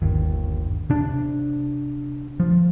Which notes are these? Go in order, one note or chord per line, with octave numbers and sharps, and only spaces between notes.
G1 D#2
C3 D4
F3